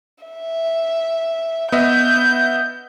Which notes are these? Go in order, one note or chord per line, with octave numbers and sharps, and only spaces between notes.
E5
B3 D#5 E5 G6